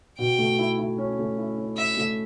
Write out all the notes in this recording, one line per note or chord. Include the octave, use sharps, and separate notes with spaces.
B2 G5
A3
E4
E4
C#4
A3
E4
C#4
C#4 E5
A3